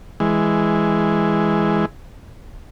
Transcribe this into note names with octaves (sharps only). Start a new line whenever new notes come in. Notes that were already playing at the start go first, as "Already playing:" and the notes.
E3 G#3